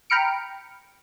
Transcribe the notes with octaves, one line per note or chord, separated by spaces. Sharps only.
G5 A#5 B5 F6 C#7 D7